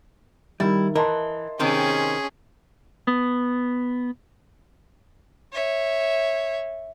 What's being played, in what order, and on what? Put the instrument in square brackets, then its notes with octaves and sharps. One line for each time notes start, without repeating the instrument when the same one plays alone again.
[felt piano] D#3 A6 [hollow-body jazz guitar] G3 [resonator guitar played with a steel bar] E4
[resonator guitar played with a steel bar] E3 [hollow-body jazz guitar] A#4 [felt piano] D#5 A5 C6
[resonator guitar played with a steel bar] C3 D#3 C4 [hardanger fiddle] C#4 G#4
[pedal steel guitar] B3
[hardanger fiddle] C#5 E5